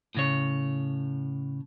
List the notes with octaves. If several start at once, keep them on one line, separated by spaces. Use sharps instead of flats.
A2 C#3 C#5